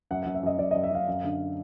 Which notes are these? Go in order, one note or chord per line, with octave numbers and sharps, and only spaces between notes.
F#2 F#5
F#2 F#5
E5
F#2 D#5
F#2 D5
F#2 D#5
E5
F#2 F5
F#2
D3